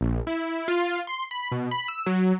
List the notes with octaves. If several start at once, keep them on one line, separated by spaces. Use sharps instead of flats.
A#1
E4
F4
C6
B5
B2
B5
E6
F#3